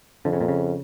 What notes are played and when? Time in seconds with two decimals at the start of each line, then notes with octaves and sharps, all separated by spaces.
0.25 F2 D3
0.33 C#3
0.41 A#2
0.48 C#3